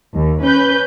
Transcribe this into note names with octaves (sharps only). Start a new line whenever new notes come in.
D#2
C#4 B4 G6